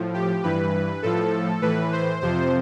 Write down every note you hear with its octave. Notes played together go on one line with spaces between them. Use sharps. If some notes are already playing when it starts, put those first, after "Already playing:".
Already playing: A2 F3
G4
G2 E3 B4
A2 F3 A4
A2 E3 B4
C5
F2 C3 F3 C5